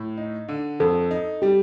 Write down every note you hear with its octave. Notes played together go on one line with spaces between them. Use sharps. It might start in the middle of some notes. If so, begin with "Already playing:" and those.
Already playing: A2
D#4
D3
F2 A4
D#4
G3 G4